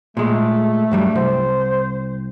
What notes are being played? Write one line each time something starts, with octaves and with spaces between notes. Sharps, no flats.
A#2 G#3 A3
G2 F#3 G3
C2 C5